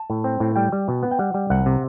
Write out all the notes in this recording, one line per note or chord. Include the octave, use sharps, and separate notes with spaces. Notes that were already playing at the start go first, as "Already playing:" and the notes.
Already playing: A5
A2
C4
A2
G3 G5
G3
B2
B3
G5
G3 F#5
G3
C2 F#5
C3